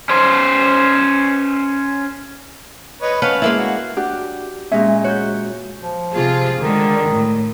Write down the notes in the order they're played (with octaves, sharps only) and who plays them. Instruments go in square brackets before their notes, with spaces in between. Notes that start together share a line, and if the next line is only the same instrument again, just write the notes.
[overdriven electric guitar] C#4 C5
[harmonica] B4 C#5 D#5
[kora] C#4 B4 F#5 [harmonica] F5 A5 F6
[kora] G#3 A#3 E4
[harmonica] F#4
[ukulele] D4 F#4 [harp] G4
[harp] A#2 G#3 C#4 [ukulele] E5
[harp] F#4 G6 [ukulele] C#5
[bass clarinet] F3
[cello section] C3 F4 G#4
[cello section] D3 G#3 [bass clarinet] D#3
[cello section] A2